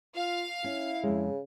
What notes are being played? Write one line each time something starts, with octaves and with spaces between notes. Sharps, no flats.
F4 F5
C#4 E4
F2 C#3 G#3